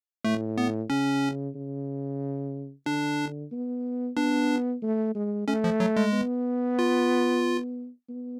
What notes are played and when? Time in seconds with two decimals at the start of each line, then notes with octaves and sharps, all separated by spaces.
0.25 A2 A3
0.58 B3
0.90 C#3 C#4
1.55 C#3
2.86 D3 D4
3.52 B3
4.17 B3 D4
4.82 A3
5.15 G#3
5.48 A3 C#4
5.64 F3
5.80 F#3
5.97 G#3
6.13 B3
6.79 F4
8.09 B3